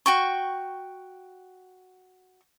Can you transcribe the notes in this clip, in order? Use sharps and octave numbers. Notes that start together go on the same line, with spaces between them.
F#4 G5 C#6